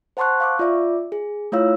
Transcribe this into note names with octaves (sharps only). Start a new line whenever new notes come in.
C5 F#5 A5 C6 C#6 F#6
F5 C#6 D6
F4 D5 E5 D6
G#4
A3 E4 F4 C#5 F5 E6